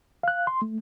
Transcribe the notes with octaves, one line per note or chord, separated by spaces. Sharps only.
F5 F#6
C6
A3